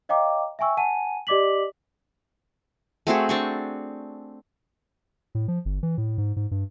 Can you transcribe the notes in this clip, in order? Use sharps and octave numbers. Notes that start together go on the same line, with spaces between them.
C#5 D#5 F5 G5 A#5 D6
E5 G5 G#5 C#6 E6
F#5 G#5 A5 D#7
G4 D5 D#5 D6 B6 F#7
A3 C4 F#4 G#4
C4 D4 C#6
A2
F3
G1
E3
A2
G#2
G#2
G2